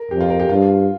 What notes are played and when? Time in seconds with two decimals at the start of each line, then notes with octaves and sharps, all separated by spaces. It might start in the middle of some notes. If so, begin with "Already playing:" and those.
Already playing: A#4
0.11 F2 G4
0.21 F4
0.30 A#4
0.40 G4
0.49 G2 F4